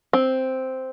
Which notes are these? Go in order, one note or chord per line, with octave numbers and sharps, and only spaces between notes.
C4